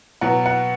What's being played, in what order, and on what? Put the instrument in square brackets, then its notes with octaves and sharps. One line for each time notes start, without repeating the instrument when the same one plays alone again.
[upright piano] B2 F#3 B3 F#5
F#5